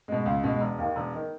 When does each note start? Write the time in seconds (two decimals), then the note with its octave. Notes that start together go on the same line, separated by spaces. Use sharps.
0.08 B2 G#3
0.26 C#2
0.44 B2 G#3
0.61 E1
0.79 D#2 D#3
0.96 E1
1.15 D#3